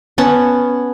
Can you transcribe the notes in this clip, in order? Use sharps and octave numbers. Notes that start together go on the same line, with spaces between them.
B3 C#4 F#5 A5